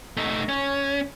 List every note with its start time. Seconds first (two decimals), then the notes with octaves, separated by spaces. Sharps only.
0.17 A3 D#4
0.49 C#4